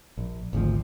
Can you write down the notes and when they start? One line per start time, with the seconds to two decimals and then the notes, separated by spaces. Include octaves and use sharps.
0.18 A#1
0.53 G#1 D2 F3